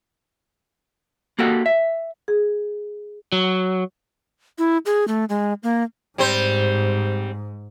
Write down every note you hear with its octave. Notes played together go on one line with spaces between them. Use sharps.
A#3 F#4 G4 A4 F#5
E5
G#4
F#3
E4
G#4
A3
G#3
A#3
G#2 G3 C4 C5